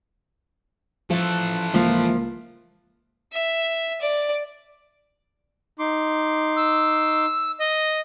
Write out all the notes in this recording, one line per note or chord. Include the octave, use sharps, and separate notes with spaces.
E3 F3 A4
C#2 F3 A#3
E5
D5
D#4 C6 D6
E6
D#5